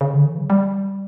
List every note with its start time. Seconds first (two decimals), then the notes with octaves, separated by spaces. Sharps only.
0.01 C#3
0.14 D3
0.25 E3
0.38 F#3
0.50 G3